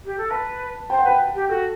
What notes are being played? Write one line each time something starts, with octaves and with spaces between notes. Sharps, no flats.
G4
A4
B4 A5
C5 G5
F#5
B4 G5
G4
F#4 A4